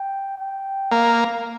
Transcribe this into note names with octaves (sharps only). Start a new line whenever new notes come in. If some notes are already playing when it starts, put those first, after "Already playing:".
Already playing: G5
G5
A#3 F5